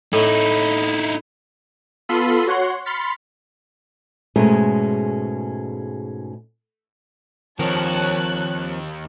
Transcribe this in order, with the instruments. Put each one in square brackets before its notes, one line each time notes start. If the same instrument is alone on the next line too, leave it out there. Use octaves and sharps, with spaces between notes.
[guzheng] A2 [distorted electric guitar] D#4 E4
[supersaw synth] B3 F4 A4 B5 C6 D#7
F#4 C#5 F#5 C6
B5 C6 F6 A6 B6 C#7
[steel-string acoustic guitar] G#2 B2 G#3 A3 C#4 G#4
[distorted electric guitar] D#2 [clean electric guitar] F3 C4 A#4 [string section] C#5 A5 F#6